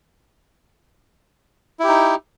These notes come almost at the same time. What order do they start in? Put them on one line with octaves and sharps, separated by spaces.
E4 G4 D#4